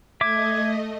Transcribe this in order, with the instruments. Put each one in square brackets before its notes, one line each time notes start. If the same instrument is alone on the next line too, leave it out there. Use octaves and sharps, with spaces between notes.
[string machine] A3 D#5 [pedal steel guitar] E5 D6 [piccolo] G#6